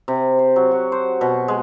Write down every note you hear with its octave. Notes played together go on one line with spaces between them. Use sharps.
C3
C5
F#3
F#4
C5
B2
G#3